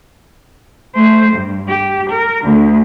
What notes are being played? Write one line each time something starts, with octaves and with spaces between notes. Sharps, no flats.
A3 C5
G2
G4
A#4
D2 D3